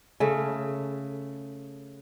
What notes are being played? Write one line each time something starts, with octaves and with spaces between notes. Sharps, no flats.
C#3 A3